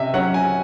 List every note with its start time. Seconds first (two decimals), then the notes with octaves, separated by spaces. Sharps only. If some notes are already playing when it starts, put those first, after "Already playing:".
Already playing: C3 C#4 D#5 E5
0.14 F#3 C#4 F#5
0.34 G#5